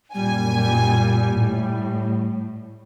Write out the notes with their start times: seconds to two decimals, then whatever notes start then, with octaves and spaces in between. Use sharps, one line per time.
0.14 F#2 A#2 G3 G#5
0.52 G3
1.36 A2